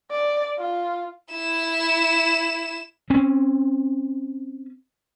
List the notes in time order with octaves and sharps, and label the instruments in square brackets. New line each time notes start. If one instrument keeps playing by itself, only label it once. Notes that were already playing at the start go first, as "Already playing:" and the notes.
[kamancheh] D5
F4
[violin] E4 E7
[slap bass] C4 C#4